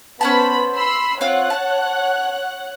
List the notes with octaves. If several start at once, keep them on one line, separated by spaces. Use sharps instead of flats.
B3 C#4 C5 A5 B5
B5 C6 E6
C4 F4 C#5 F5 F#5 F#6
A5